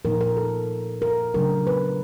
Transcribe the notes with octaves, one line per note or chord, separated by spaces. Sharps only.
A#2 F3 A#3 D#4 A#4
A#4
A4
A#4
C#3 F#3 A3 D4 A#4
B4